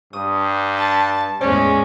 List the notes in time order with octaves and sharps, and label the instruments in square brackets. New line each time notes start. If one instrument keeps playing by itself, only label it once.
[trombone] G2 [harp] D#6
[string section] A5
[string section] E2 A2 G#3 [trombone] C#4 [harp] C5 D5